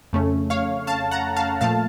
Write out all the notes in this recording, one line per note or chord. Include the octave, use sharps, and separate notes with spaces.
F2 C#3 A3 C#4
C#5 F5
F5 A5
F#5 A#5
F5 A5
A#2 F3 A3 F5 A5